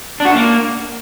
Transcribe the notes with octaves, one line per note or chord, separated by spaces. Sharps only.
D4
F#4
D4
A#3